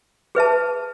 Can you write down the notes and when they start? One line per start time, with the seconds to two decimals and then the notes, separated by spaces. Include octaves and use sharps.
0.35 G#4 B4 E5 A5